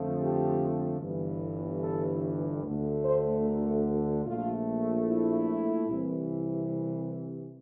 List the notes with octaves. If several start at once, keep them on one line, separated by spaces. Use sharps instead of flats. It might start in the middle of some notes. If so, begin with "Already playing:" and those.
Already playing: F2 D3 F3 A3
G4
G1 G2 E3
A4
D2 D3 A3
C5
A#4
A#1 A#2 A3 F4
E4
C2 C3 E3